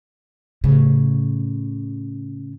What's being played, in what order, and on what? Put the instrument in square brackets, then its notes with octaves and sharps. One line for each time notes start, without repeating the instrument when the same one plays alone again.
[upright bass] A2 C#3